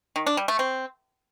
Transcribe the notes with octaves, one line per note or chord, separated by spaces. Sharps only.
D#3
D4
G3
A3
C4